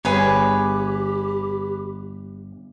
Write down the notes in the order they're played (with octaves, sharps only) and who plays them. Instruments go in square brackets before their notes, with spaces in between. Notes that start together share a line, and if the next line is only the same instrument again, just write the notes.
[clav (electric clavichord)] G1 [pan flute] G4 [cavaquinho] G#4 B4 C#5